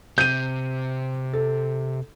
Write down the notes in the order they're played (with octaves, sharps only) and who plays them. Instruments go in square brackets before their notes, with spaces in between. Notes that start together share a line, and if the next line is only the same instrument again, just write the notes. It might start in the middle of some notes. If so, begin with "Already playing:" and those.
[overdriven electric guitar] C3 [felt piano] G6 D#7
[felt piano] A4